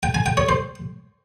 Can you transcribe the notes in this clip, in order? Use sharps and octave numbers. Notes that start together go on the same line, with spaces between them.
G5
G#5
G5
C#5
C5